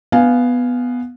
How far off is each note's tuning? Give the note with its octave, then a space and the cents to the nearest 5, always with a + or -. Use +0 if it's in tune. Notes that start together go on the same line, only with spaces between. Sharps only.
B3 +0 F5 +0 G#5 +0